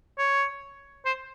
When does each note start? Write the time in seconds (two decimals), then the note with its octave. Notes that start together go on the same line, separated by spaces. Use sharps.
0.19 C#5
1.06 C5